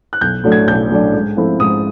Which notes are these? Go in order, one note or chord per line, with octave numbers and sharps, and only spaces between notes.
F#6
B1 G6
A2 F#3 A3 D4
G#6
B1 G6
A2 F#3 A3 D4
G#2
F3 A3 C4 E4
G#2 D#6